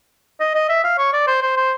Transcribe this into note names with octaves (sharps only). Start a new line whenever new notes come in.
D#5
D#5
E5
F5
C#5
D5
C5
C5
C5